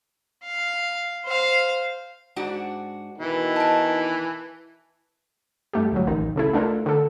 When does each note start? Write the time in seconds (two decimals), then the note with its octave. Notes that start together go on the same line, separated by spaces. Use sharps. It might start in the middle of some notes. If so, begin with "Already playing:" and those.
0.44 F5
1.25 C5 F5
2.36 G#2 D4 F#4
3.18 B2 D#3 E3
3.56 A#4 A5
5.73 G2 A3 G4
5.92 D2 A2 F#3
6.07 A1 D#3 D#4
6.36 C#2 A3 E4
6.53 A3 D4 F4 A4 A#4
6.86 D3 A4